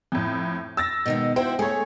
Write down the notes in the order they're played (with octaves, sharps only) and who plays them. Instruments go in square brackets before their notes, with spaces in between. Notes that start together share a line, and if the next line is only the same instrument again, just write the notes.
[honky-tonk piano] F2 A2
E6 A6 A#6
[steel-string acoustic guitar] B2 D#3 G#3
[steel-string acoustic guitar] E4 F#4 [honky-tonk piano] C5 G5
[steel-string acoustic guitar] A3 [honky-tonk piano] G#4 C#5